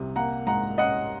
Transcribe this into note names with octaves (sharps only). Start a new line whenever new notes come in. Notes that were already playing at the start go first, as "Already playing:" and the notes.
Already playing: C2 C3
A#3 F#5 A#5
G#2 F#5 A#5
C#4 D#5 F#5